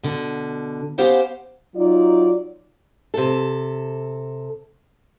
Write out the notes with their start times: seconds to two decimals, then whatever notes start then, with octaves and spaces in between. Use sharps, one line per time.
0.03 B2 D3
0.98 B3 C#4 G4 C5 F5 F#5
1.74 F#3 D#4 F4 D5
3.14 C3 A4